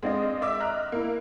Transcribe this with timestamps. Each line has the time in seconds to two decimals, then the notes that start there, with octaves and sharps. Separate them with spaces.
0.03 G#3 C4 D4 F4 D#5
0.41 D5 E5 D6 E6
0.60 D#5 A#5 F6 F#6
0.92 A#3 E4